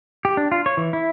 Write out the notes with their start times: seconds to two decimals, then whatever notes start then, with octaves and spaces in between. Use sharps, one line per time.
0.25 G4
0.37 D4
0.52 F4
0.66 C#5
0.77 E3
0.93 E4